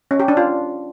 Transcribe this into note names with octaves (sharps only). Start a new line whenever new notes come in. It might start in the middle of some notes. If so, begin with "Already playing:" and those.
C#4
G4
D4
F4